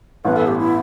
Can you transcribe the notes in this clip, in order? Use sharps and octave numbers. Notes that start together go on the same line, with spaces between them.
A1 G2 E3 B3 B4
A4
G4
E4